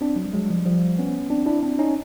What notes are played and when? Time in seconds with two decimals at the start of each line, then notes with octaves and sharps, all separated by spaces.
0.01 C4 D4
0.16 F#3
0.26 G3
0.33 F#3 G#3
0.50 F3 G3
0.65 F3 G3
0.98 B3 C#4
1.30 C4 D4
1.46 D4 E4
1.63 C4 D4
1.79 C#4 D#4